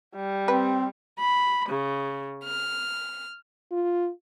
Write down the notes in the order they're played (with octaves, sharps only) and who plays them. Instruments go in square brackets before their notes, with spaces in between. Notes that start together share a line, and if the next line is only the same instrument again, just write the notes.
[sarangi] G3
[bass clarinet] C4 [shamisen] B4
[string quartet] B5
C#3
F6
[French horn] F4